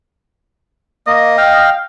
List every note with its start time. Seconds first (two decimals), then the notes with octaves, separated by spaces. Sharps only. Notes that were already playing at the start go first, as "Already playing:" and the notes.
1.07 A#3 D#5
1.38 F5 G5